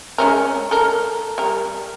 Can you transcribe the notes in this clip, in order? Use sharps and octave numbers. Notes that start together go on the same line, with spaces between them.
G#3 C#4 A#4
A4 A#4
G3 A#4